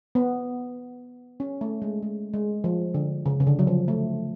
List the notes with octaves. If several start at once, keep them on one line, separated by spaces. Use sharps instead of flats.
B3
C#4
A3
G#3
G#3
G#3
F3
D3
C#3
C#3
D3
F#3
F3
A3